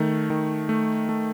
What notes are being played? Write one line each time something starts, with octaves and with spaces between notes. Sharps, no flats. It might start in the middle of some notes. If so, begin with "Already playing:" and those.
Already playing: D#3 A3
D#3
A3
A3